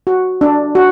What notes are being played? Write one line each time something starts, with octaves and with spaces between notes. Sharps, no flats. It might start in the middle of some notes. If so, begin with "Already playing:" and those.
F#4
D4
F#4